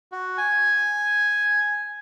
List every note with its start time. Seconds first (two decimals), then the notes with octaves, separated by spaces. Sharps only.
0.12 F#4
0.38 G#5